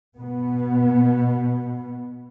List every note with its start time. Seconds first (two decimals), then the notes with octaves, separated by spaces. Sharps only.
0.17 B2 B3